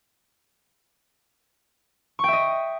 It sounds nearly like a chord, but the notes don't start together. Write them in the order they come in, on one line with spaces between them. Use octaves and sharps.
C#6 G5 E5 D#5